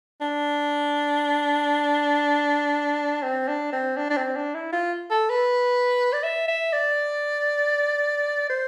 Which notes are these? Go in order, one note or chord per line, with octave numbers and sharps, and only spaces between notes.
D4
C4
D4
C4
D4
D4
C4
D4
E4
F4
A4
B4
D5
E5
E5
D5
C5